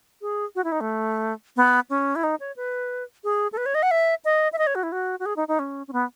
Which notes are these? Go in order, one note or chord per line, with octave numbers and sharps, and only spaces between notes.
G#4
F#4
E4
D#4
A3
B3
C#4
E4
D#4
C#5
B4
G#4
A4
B4
C#5
D#5
F#5
E5
D#5
E5
D#5
C#5
F#4
E4
F#4
F#4
G#4
D#4
D#4
C#4
C#4
B3